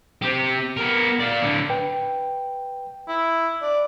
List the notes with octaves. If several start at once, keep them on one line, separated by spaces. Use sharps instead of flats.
C4 G4
B3 A#4
D5 F5
A2 D3
B4 G5
E4
D5